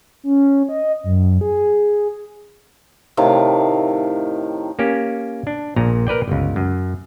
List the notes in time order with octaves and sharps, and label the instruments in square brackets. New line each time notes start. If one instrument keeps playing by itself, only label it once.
[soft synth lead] C#4
D#5
F#2
G#4
[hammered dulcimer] A2 C3 D#3 F5
[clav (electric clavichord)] A#3 C#4 G4
D4
A#1 A#2 A#5
A#4 B4 D5 G5
G1 C#2
F#2